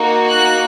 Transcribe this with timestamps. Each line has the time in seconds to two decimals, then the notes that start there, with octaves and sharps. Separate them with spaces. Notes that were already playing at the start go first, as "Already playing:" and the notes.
Already playing: A#3 D#4 F#4
0.29 F#6